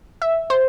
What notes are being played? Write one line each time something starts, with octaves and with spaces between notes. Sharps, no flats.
E5
C5